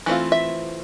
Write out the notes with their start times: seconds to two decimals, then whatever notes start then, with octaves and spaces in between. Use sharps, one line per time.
0.06 E3 A3 C4 F4
0.32 E5